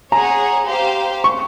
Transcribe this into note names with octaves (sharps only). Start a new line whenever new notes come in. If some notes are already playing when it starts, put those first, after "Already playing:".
G#4 C#5 F#5 A#5
G4 C5 F5
C#6